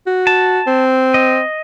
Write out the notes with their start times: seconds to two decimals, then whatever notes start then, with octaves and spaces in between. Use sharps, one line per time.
0.07 F#4
0.27 A5
0.67 C4
1.14 D#5